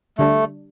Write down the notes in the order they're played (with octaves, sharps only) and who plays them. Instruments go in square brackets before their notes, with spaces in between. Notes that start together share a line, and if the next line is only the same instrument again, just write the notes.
[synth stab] D3 G3 D4 [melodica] A3